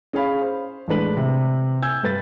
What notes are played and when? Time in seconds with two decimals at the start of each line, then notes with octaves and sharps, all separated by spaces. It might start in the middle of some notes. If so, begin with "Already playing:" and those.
0.13 C#4 G#4 C#5 F5 B5
0.42 C5
0.88 A1 G#3 D4 B4 F#7
1.17 C3
1.82 G#5 E6 G6 G#6
2.03 G2 G3 B4 A6